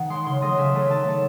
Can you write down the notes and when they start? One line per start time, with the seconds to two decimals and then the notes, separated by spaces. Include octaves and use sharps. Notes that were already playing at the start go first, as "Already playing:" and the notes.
Already playing: D#3 F#5
0.10 G#3 C6
0.26 C#3 C6
0.41 F#3 A3 D#5
0.58 C#3 E5
0.74 F#3 A3
0.90 D#3 A5
1.06 F#3 A3